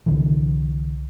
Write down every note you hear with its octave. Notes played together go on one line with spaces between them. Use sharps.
C2 D3 E3